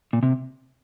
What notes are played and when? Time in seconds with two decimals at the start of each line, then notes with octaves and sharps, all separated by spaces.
0.13 A#2
0.23 C3